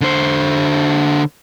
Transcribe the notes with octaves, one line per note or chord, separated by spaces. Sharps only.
D3 C5